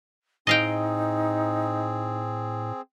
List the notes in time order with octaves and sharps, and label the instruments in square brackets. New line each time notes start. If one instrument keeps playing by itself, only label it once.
[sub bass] A2 [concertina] C4 G#4 [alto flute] D#4 [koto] D#5 F5 G5